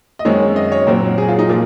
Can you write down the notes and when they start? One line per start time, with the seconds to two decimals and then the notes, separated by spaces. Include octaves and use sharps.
0.19 D#5
0.25 F#2 D#3 G#3 C4 C#5
0.56 D#5
0.72 C#5
0.87 A#2 F#3 C4 A#4
1.18 G#4
1.28 F4
1.39 D#4
1.49 A#2 F3 A#3 F4